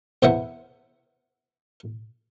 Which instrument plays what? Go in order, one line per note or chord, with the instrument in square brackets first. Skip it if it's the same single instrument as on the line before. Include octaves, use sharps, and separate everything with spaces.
[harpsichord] E2 C3 B3 C5 E5 F#5